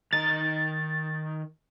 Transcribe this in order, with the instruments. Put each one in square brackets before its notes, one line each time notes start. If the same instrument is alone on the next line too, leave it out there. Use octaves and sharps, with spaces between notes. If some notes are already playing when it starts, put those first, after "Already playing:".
[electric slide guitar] D#3 A#5 [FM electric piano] A6